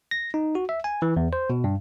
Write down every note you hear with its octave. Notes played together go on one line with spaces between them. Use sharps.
A#6
D#4
F#4
E5
G#5
E3
E2
C5
B2
G2